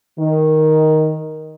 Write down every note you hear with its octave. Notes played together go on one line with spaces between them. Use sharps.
D#3